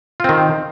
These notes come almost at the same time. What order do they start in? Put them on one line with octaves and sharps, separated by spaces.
F4 C4 D#3